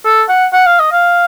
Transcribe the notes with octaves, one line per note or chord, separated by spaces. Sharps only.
A4
F#5
F#5
F5
D#5
F5